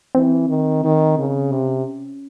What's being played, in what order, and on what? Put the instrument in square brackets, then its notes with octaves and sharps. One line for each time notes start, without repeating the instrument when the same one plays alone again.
[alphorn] E3 [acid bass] C4
[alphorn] D#3
D#3
C#3
[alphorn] C3 [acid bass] C#4
[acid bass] C4
C#4